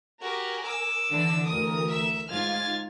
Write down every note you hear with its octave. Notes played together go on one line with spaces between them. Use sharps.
F#4 G4 A#4 G#5
D6 E6
D3 E3 D4
D2 E3 A#4 D#6
E5 E6
G#2 F4 F6 G#6 A6